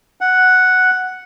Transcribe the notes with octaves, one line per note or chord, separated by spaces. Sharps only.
F#5